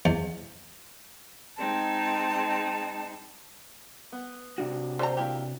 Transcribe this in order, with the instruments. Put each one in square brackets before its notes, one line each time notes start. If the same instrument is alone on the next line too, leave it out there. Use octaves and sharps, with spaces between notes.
[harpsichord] E2
[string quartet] G#3 C4 D#4 [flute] A5
[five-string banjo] B3
[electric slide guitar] C3 D4 F#4
[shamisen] D3 F4 A#5 [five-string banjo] C5
[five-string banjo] A#3 E4 G4